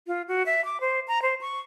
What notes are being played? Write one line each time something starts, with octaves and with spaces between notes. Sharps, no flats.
F4
F#4
E5
D6
C5
A#5
C5
C#6